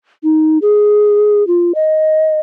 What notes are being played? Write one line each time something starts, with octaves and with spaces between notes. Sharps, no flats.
D#4
G#4
F4
D#5